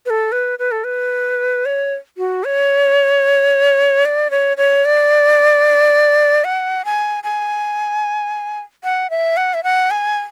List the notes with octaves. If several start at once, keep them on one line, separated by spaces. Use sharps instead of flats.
B4
A4
B4
B4
A4
B4
C#5
F#4
C#5
D5
C#5
C#5
D5
F#5
G#5
G#5
F#5
E5
F#5
E5
F#5
G#5